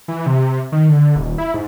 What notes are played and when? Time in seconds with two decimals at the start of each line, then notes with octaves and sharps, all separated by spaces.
0.08 E3
0.26 C3
0.72 D#3
0.89 D3
1.16 D#1
1.38 E4
1.54 G#2